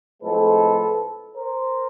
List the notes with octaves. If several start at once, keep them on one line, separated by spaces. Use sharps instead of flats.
A2 F3 G#3 C4 A4 B4
A#4 C5